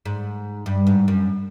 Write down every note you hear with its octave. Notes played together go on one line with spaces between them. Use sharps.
G#2
G2
G#2
F#2